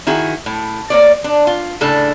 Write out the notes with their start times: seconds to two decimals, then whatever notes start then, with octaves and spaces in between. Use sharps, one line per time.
0.07 D#3 E4 F#4 G#4
0.46 A2
0.90 A#3 C#5 D5
1.24 D4
1.47 F4
1.81 A2 C#3 D4 A4